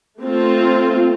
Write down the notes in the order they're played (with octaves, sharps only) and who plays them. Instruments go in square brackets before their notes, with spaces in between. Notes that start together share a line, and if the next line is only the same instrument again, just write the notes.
[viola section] A3 C4 F4